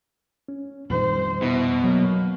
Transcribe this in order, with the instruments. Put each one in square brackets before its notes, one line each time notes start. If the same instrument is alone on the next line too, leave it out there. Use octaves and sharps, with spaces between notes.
[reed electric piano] C#4
[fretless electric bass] F2 D#3 [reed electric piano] A#2 G3 [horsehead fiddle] C5
[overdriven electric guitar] B2 [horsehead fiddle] E4
[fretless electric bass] F#3 [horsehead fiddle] A#3